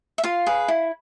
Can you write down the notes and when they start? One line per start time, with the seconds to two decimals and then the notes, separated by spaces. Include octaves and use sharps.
0.18 E5
0.24 F4 F5
0.46 G#4 B4
0.68 E4